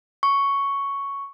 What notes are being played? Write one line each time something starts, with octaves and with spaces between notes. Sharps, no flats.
C#6